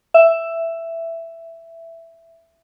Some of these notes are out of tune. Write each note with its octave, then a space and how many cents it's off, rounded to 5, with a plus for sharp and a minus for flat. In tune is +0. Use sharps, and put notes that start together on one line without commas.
E5 +10